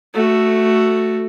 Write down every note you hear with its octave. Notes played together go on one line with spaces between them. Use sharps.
A3 F#4